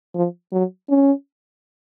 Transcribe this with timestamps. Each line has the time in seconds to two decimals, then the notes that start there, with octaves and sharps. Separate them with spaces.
0.15 F3
0.52 F#3
0.89 C#4